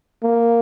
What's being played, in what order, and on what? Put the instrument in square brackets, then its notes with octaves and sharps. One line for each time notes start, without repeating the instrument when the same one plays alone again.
[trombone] A#3